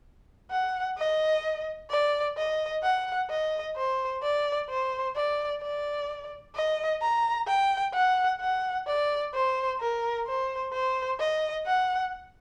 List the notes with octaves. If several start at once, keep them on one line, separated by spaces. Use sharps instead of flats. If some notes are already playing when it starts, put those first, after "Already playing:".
F#5
D#5
D5
D#5
F#5
D#5
C5
D5
C5
D5
D5
D#5
A#5
G5
F#5
F#5
D5
C5
A#4
C5
C5
D#5
F#5